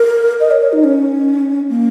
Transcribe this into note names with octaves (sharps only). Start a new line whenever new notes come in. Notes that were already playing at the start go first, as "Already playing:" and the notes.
Already playing: A#4
D#5
C#5
C#5
D#4
C#4
A#3